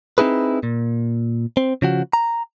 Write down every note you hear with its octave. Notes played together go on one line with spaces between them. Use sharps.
C4 D#4 E4 G#4 B4
A#2
C4
C#3 F3 F#4
A#5